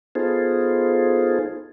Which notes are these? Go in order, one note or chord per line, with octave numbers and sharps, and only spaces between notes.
B3 D#4 F4 G#4 A4 C5